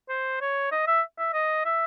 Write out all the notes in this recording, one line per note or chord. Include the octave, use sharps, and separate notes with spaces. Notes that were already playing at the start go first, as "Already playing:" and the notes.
C5
C#5
D#5
E5
E5
D#5
E5